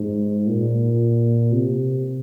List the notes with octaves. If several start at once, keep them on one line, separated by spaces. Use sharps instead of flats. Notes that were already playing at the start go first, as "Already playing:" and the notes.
Already playing: G#2
A#2
C3